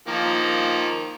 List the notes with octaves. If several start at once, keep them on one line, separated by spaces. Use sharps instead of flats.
D#3 F3 A#3